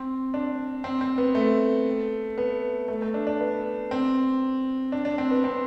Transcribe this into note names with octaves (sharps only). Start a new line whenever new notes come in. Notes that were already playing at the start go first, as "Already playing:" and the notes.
Already playing: C4
D4
C4
C4
B3
A3
B3
A3
A3
D4
D4
B3
C4
D4
D4
C4
B3
C4